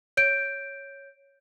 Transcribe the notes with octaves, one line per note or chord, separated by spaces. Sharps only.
C#5 G6 D7